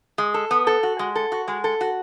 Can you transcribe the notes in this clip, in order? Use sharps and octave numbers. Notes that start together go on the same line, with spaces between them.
G#3
A4
B3
A4
F#4
G#3
A4
F#4
G#3
A4
F#4